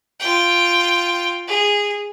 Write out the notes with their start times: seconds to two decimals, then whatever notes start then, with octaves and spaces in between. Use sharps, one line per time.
0.20 F4 G5
1.48 G#4